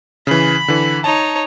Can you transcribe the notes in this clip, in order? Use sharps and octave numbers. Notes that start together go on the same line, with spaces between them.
C#3 E3 B5
D3 E3
D#4 C#5 A5